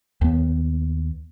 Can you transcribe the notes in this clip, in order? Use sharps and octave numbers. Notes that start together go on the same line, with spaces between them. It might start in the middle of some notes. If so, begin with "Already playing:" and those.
D#2 B3